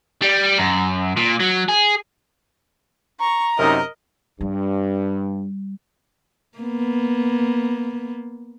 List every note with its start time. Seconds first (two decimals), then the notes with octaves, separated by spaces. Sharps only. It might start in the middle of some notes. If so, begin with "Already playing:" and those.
0.22 G3
0.59 F#2
1.17 A#2
1.40 F#3
1.69 G#4
3.20 A#5 C#6
3.58 F#2 C3 D#4 A#4 D#5
4.41 G2 G3
6.58 A#3 B3